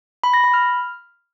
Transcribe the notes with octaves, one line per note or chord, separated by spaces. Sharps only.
B5
A#6
B5
F6